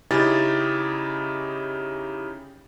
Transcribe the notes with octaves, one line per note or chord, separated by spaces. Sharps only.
C#3 C#4 D#4 E4 G4 A6